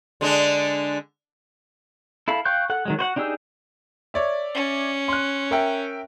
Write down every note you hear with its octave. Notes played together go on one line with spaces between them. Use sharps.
D3 G#3 D4
E4 A4 F5 B5
F5 G5 C#6 F#6 G6
A4 F#5 F#6
D#3 F#3 G#3
F#4 C5 F#5
D4 D#4 G4 G#4 E6
C#5 D5 E5
C#4
C6 F#6
A#4 E5 G5